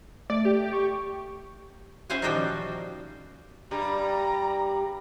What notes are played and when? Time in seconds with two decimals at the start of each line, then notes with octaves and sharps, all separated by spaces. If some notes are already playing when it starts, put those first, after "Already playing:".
0.30 A3 D5
0.45 G4
0.73 C#6
2.10 C#4 E4 C5 F5 F#5 G#5
2.22 A#2 D#3 F3 G3 F#4 G5
3.71 G2 G3 A#5